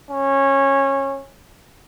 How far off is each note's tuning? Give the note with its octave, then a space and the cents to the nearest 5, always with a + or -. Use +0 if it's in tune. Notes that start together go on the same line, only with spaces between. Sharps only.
C#4 -20